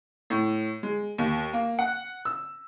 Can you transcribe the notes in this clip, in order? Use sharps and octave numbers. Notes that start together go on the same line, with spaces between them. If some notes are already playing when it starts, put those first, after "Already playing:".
A2
G#3
D#2
A#3
F#5
E6